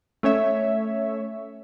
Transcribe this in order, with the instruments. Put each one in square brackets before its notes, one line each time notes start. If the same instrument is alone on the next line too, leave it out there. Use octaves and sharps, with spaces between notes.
[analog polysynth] A3 C#4 C#5 E5